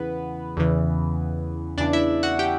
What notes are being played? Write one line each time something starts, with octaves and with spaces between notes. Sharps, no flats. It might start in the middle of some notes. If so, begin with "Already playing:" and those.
Already playing: E2 C#3 E3 B3 B4
E2 C#3 E3
E2 C#3 E3 D4 D5
E4 E5
F#4 F#5
G4 G5